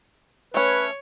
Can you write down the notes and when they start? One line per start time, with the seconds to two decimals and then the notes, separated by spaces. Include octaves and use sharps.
0.54 A3 C#4 B4 C#5